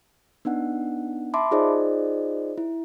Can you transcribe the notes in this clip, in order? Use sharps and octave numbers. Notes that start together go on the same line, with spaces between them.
B3 D4 D#4 F#5
E5 A5 B5 C6 D6
D#4 F4 G#4 C5 D5 D#5
E4